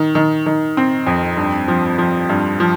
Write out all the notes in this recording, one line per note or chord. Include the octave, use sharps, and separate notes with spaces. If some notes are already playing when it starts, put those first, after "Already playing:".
Already playing: D#3
D#3
D#3
C4
F2
G2
F3
F3
G2
F3